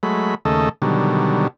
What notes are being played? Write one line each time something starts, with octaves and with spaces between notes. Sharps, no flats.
F#3 G#3 A3 B5
D#2 C#3 A3 A4 D#5
B2 D3 D#3 F#3 G3